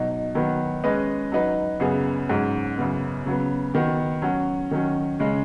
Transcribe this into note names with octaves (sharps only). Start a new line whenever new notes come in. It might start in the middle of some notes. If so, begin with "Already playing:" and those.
Already playing: B2 F#3 D#4
D#3 F#3 B3
G#3 C#4 B4 D#5
F#3 D#4 B4
F#2 C#3 B3 G#4
G#2 F#3 C#4
F#2 C#3 B3
C#3 F#3 B3
D#3 B3 F#4
F#3 C#4 F#4
D#3 F#3 C#4
C#3 G#3 C#4